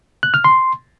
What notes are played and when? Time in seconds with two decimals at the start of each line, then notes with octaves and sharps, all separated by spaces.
0.23 F#6
0.34 F6
0.44 C6